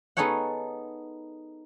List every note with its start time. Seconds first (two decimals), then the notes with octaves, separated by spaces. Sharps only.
0.17 B3 D#4 G#4 A4 C#5 F#5